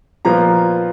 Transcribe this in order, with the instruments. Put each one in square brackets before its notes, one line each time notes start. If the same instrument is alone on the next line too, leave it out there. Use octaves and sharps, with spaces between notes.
[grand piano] A#2 F3 B3 F4 A#5